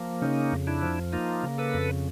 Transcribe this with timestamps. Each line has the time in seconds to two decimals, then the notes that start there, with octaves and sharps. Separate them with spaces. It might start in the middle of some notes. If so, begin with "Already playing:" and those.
Already playing: F3 A#3
0.22 C#3 C#4 D#4
0.52 F2
0.67 D4 E4
0.83 F3
1.13 A#3 D#4 F4
1.43 C#3
1.58 A4 B4
1.74 F2